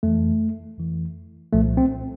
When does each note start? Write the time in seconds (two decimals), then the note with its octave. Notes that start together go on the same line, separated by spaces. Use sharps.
0.03 F2 E3 A3
0.78 F2 E3
1.53 C2 A#2 F3 A3
1.77 C4